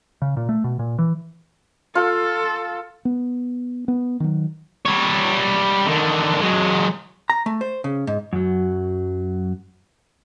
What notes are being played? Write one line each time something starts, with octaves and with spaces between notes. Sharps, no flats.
C#3
A#2
A3
B2
A#2
E3
F4 A4
B3
B3
D#3 F#3
G3 C#5
D3 D#3
F#3 G#3
A#5
A3
C5
C#3
G#2
F#2 F#3